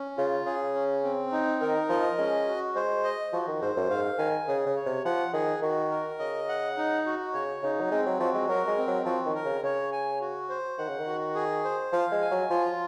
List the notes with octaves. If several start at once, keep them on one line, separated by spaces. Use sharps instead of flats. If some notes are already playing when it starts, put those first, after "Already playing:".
Already playing: C#4
C#3 F4
C#3 G#4
C#4
C4
D#4
D#3 A#4
F3 D#5
G#3 C#4
F#4
G#3 C5
D#5
F3 F#4
D#3
G#2 C5
F#2
G#2 F5
D#3 G#5
C#3 G#4
C#3
C#5
C3
F3 F#5
D#3 G#4
D#3 F#4
A#4
C#3 D#5
F#5
D#4
F#4
C#3 C#5
C#3 D#4
F#3
G#3 C4
F#3
F3 F#4
G#3
F#3 A#4
G#3
C4
F#3
F3 F#4
D#3
A#4
C#3
C#3 C#5
G#5
F#4
C5
D#3 F#5
C#3
D#3
F#4
G#4
C5
F3 F5
G#3
G#5
F#3
F3 F4